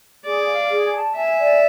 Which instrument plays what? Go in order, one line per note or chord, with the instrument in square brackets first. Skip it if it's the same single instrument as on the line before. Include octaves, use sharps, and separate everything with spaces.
[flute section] G#4 [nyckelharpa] D5
[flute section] F5
G#4
A5
[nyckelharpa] E5 [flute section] G#5
[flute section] D5